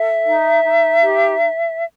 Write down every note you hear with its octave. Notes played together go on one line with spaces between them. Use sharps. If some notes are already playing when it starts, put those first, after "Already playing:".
Already playing: A4 E5
D#4
D#4
G4